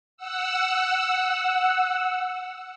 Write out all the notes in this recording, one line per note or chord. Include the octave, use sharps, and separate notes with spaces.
F#5 E6